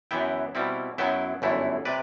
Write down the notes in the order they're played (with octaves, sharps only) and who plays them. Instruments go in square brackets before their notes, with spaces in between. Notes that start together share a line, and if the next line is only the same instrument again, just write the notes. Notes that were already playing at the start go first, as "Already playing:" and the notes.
[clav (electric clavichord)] F#2 E3 B3 E4 E5 G5
B2 G3 C4 E4
F#2 F#3 B3 E4 E5 G5
G1 F#2 E3 A3 E4
C3 B4 D5